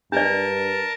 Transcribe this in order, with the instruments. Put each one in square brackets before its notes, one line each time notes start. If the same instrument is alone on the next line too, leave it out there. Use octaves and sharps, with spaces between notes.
[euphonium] G2 [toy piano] D4 D5 [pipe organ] A#4 A5